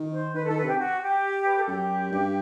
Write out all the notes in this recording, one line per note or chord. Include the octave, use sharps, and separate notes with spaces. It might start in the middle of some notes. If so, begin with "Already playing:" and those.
Already playing: D#3
C5
D#3 B4
D#3 A4
B4
C3 G4
F#4
G4
B4
A4
F#2 G4
G2